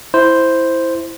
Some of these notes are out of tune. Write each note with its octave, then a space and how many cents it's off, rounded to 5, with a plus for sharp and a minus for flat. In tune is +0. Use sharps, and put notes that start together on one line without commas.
E4 +0 C5 +0